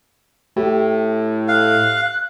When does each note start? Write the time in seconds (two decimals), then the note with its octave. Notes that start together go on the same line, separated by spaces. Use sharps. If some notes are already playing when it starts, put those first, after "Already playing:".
0.56 A2 G4
1.48 F5 F#6